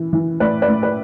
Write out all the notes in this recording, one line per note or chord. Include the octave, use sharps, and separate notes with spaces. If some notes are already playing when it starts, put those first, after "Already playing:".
Already playing: E3
E3
A2 B4 D5
B4 D5
A2
B4 D5